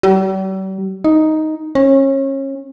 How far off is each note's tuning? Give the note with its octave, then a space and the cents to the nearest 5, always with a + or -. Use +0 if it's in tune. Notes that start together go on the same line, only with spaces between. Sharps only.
G3 -45
D#4 +5
C#4 -30